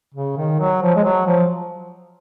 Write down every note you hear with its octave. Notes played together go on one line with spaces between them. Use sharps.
C#3
D#3
F#3
F3
G#3
F#3
F3